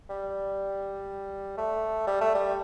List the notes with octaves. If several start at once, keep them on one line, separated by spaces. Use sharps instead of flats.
G3
A3
G3
A3
G3